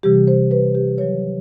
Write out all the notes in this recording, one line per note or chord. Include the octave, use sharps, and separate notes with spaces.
C3 E3 G3 G4
C5
B4
G4
C3 D#3 F#3 C#5